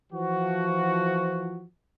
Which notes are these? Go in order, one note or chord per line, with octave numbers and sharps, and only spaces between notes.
E3 F3 F#4